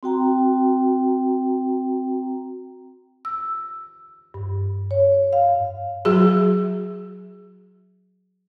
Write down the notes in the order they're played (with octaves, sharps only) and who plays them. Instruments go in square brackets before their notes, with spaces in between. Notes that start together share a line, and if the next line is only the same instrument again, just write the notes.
[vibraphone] C4 F#4 G5 A#5
[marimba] E6
G2
C#5
F5
[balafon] F#3 F#4 G#4